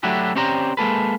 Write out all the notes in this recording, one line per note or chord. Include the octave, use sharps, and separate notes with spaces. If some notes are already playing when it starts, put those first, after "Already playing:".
F#3 A3 D4 E4 F#4 G4
C4 C#4 G4 C5 D5 A#5
G#3 A#3 A4 B4